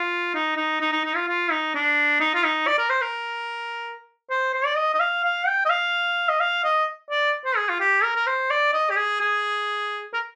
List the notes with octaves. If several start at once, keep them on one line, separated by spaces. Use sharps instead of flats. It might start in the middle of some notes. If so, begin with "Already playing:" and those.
Already playing: F4
D#4
D#4
D#4
D#4
D#4
F4
F4
D#4
D4
D#4
F4
D#4
D5
A#4
C5
A#4
C5
C5
D5
D#5
D#5
F5
F5
G5
D#5
F5
D#5
F5
D#5
D5
C5
G#4
F4
G4
A#4
A#4
C5
D5
D#5
G4
G#4
G#4
A#4